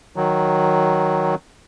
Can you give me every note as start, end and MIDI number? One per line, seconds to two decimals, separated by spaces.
0.16 1.35 51
0.16 1.35 54